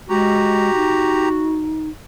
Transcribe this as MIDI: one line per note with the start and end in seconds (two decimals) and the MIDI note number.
0.09 0.74 56
0.09 1.76 66
0.09 1.29 67
0.09 1.29 82
0.75 1.89 63